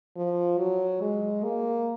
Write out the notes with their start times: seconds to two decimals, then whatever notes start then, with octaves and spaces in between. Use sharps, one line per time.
0.16 F3
0.58 F#3
1.01 G#3
1.44 A#3